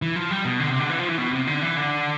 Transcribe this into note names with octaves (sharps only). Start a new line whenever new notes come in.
E3
F3
G3
B2
D3
C3
D3
E3
F3
E3
B2
C3
D3
E3
D3